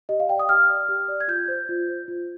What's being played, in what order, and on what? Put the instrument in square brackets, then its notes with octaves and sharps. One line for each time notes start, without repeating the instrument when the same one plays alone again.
[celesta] G4 D#5
F5
D5 G5
D#6
G4 F6
D5
G4
D5
G#6
F4 G6
C5
F4
C5
F4